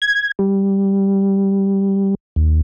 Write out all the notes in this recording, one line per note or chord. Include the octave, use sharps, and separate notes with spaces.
G#6
G3
D#2